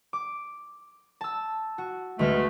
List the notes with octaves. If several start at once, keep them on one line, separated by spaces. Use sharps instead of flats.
D6
A5 E6
F#4
D2 B2 G#3 A3 F6